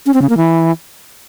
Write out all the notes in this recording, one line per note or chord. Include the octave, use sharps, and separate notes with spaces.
C#4
C4
C#3
A#3
E3